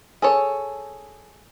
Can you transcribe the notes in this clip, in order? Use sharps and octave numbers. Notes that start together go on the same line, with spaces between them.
G#4 A4 C#5